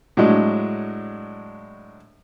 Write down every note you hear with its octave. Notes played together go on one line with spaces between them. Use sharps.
A2 F#3 G#3 D4